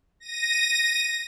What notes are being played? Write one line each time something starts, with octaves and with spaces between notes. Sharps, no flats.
A#6 D#7